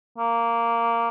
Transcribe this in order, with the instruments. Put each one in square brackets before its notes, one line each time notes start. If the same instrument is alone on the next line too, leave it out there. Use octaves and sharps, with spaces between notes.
[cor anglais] A#3